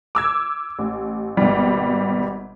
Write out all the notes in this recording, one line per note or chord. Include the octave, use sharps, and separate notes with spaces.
D6 E6 G#6
A1
G#1 B2 G3